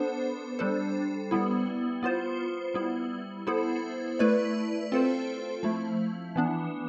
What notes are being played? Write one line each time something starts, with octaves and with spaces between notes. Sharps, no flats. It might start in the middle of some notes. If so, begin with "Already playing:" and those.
Already playing: B3 D4 A4 C5
G3 D4 A4 C5
G3 B3 E4
B3 F4 C5
G3 B3 E4
B3 E4 A4 C5
A3 E4 B4 D5
C4 F4 A4 C5
F3 A3 E4
E3 B3 D4